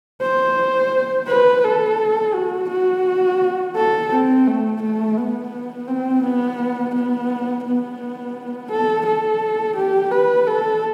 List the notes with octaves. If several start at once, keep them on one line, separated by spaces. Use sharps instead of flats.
C5
B4
A4
F#4
F#4
A4
C4
A3
A3
B3
C4
B3
B3
B3
A4
A4
G4
B4
A4